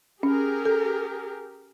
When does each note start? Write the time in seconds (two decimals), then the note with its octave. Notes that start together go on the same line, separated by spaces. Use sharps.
0.23 C#4 G4 G#4 A#4
0.65 A4